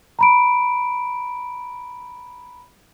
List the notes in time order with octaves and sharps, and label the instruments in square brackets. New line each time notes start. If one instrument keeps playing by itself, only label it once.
[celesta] A#5 B5 D7